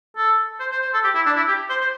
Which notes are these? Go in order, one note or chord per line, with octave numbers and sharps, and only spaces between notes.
A4
C5
C5
C5
A4
G4
E4
D4
E4
G4
C5
C5